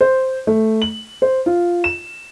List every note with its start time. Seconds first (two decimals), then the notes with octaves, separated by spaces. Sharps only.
0.01 C5
0.47 A3
0.82 F#7
1.22 C5
1.46 F4
1.84 E7